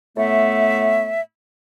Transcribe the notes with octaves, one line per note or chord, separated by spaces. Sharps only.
A2 A3 B3 E5